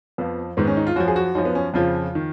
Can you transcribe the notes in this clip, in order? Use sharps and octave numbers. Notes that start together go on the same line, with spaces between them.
F2 F3 B3
G#2 D#3 B3
C#4
D#4
F4
F#2 F3 F#4
G#4
F#4
F#2 F3 D#4
B3
C#4
F2 C#3 F3 F4
D#3